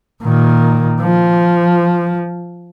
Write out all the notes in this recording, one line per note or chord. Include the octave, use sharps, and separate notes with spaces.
A#2 D#3
F3